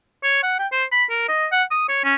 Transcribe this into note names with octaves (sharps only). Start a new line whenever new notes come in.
C#5
F#5
G5
C5
B5
A#4
D#5
F#5
D#6
C#5
C#4